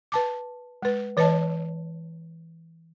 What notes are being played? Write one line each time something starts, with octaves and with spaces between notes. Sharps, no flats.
B4 A5 D6
G#3 B4
E3 B4 C#5 D#5 A5